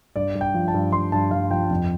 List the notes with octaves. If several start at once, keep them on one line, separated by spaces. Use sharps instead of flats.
G2 D5
G2
G5
F3
A5
G2
G2 C6
G2 A5
G2 F5
F3 G5
F2